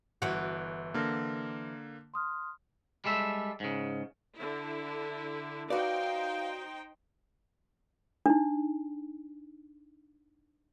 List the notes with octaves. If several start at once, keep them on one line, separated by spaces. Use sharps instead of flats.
G1 E3 F#4 F#6
D3 A#3 F6 A#6
C6 D#6 F6
G3 G#3 A4 E5
G#2 C#3
D3 E4
D#4 F#4 B4 C5 D5 F5 G5
D4 D#4